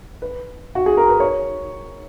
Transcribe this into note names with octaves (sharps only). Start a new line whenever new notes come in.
B4
F#4
G#4
A#4
B4
C#5